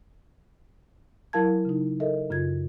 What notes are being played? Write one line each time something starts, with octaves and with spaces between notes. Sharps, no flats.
F#3 E4 A#4 F5 A5 G#6
C#3 D#4
A4 A#4 D#5 E5
F#2 C#3 F4 G#6